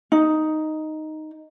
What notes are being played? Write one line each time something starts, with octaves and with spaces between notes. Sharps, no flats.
D#4